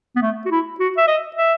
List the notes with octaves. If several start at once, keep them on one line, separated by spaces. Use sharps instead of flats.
B3
A3
F#4
E4
F#4
E5
D#5
E5